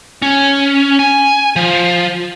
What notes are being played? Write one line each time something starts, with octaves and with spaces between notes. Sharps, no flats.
C#4
G#5
F3